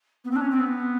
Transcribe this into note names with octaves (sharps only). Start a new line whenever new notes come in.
B3
C4
D4
C#4
C4
B3